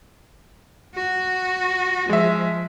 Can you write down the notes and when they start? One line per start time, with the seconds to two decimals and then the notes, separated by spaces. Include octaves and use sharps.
0.95 F#4
2.09 F3 G#3 E5